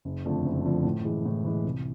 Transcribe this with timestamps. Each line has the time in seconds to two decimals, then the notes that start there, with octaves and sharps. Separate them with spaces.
0.05 F#1
0.25 F2 D3 F3 A3
0.45 F#1
0.65 F2 D3 F3 A3
0.84 A2
1.05 E3 G#3
1.25 A2
1.45 E3 G#3
1.64 C2